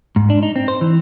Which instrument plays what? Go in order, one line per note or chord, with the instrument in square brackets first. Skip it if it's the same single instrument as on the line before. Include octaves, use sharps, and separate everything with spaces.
[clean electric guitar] G#2
D4
D#4
C4
C5
E3